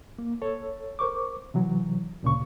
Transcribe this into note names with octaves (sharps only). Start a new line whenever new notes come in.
A#3
A4 C#5
A#4 C5 C#6 D6
C3 E3 F#3
D2 A#2 C#3 C#6